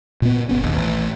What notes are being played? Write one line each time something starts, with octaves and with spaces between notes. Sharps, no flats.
A#2 B3
F#1 B3 C#4
A#1 D#2
A1